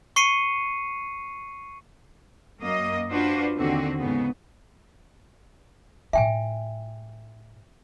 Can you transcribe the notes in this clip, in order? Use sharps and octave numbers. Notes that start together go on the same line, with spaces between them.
C#6 C7 C#7 D#7
F#2 A#3 D#5
D4 F4 F#4 B4 C5
D#2 D3 C4 F#4
G#2 C#3 B3
A2 F4 E5 G5 G#5